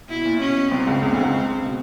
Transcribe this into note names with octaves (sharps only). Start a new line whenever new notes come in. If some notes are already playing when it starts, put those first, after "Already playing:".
B2 E4
A#2
B2 C#4
B2
C2 C3 C4
C#2 C#3
C#2 C#3
D2 D3
C#2 C#3
B2